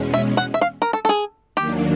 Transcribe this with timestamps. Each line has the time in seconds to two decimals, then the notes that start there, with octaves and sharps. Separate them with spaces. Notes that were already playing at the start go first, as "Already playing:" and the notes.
Already playing: E2 B2 G#3 C#4
0.14 E5
0.37 F#5
0.54 E5
0.62 F5
0.82 A#4
0.93 A4
1.05 A4
1.09 G#4
1.57 D#2 D#3 F#3 A#3 D4 G4